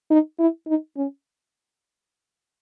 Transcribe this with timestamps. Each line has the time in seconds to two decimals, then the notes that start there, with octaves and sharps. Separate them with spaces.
0.10 D#4
0.39 E4
0.67 D#4
0.97 C#4